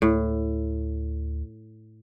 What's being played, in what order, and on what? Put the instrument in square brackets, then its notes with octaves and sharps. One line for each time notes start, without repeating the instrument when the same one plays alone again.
[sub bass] D2 [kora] A2